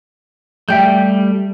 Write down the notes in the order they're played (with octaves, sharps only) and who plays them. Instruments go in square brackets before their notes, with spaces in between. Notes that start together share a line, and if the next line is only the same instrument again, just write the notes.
[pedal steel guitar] G3 A3 [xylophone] E5 G5 G6